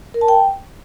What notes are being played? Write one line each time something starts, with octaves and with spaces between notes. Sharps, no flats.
A#4
A5
G5